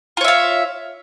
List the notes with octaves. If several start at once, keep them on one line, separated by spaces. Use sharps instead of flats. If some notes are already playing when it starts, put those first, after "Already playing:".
F4 C#5 E5 F5